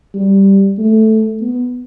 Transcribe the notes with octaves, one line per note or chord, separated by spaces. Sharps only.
G3
A3
B3